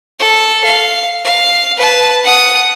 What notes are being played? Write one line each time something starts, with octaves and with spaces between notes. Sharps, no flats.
A4
F5
F5
B4 A5
F#5 D#6